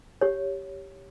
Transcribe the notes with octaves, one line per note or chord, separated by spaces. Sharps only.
G4 C#5